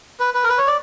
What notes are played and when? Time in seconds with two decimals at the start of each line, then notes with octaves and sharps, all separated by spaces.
0.20 B4
0.34 B4
0.44 A#4
0.49 B4
0.58 C#5
0.67 D5